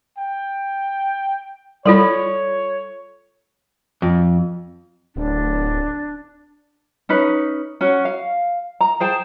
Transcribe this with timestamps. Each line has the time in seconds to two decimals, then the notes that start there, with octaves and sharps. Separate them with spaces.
0.18 G5
1.86 G3 F4 A4 C#5 B5 C6
4.02 F2
5.16 D1 D4
7.09 C#4 D#4 B4
7.81 C#4 F#4
8.05 F5
8.81 A#5
9.00 G#4 C5 G5 A5